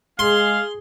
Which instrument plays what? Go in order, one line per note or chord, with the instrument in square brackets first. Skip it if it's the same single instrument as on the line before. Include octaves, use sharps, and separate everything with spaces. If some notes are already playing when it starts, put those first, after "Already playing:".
[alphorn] G#3 [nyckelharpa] G#4 [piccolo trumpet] F5 [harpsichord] C6